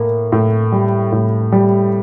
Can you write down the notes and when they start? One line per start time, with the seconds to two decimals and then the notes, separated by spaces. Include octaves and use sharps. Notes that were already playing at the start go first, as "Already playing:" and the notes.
Already playing: A2 A#3
0.32 A2
0.72 G3
1.12 A2
1.52 G3